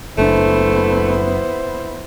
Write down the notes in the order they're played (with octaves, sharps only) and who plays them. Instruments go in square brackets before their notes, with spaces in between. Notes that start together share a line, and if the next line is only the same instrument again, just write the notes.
[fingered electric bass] F#1 D4 [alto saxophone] A3 [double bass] B3 E4 [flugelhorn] C5